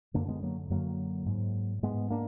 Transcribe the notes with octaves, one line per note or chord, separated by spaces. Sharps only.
F#2 D3 A#3 D4
G#3 B3
F#3 A#3
F#2 D3 F#3 A#3
G#2
G#2 G#3 B3
A#3 D4